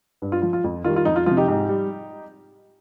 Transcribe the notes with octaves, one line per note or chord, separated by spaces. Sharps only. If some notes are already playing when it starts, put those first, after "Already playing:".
G2
F4
F3 F4
F4
F2
D#3 G3 F4
F4
F2 D#4
F4
C3 F3 F4
D#4 G4
G#2
G3